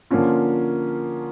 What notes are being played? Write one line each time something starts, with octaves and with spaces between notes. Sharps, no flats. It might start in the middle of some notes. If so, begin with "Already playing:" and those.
D3 F3 A#3 C#4 F4